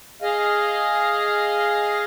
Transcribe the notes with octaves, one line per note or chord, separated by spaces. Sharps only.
G#4 D#5 F5